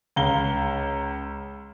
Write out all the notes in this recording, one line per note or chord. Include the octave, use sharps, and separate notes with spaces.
C#2 F5 A#5 G7